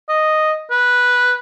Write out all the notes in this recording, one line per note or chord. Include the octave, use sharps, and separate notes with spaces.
D#5
B4